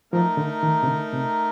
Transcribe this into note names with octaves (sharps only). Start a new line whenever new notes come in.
F3 A3 D#4 A#4
D3
D#3
C3
D3
C3